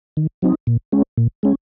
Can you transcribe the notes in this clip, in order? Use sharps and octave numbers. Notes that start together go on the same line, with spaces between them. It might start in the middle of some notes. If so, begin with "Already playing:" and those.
D#3
F#3 C4 D#4
A#2
G#3 C#4
A#2
G#3 C#4